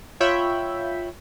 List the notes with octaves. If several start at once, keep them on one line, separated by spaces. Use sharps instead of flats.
F4 C#5 E5 G5 B5